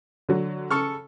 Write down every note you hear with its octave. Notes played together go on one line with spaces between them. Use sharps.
D3 F#3
C#3 A4 C#6 F6